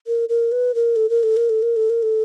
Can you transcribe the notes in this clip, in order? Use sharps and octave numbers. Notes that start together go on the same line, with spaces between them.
A#4
A#4
B4
A#4
A4
A#4
A4
A#4
A4
A#4
A4
A#4
A4